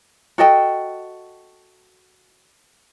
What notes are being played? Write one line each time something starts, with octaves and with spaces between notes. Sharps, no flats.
F#4 A4 D#5 G5